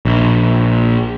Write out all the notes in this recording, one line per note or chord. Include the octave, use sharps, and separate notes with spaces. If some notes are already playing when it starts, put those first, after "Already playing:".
A#1